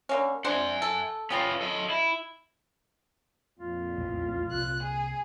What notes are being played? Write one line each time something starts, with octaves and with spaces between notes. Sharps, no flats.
D3 A#3 C#4
G#3 D4 C5 F#5 G#5
A4
C#3 B3 F4 G5 A#5
A4 D#5
E4
F2 A#2 F4
B1 E2 A2
C2 F#6
G#4